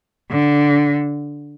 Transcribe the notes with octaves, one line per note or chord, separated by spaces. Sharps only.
D3